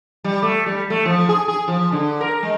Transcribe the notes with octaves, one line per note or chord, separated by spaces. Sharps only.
G3
A3
G3
A3
F3
G#4
G#4
F3
D3
A#4
G#3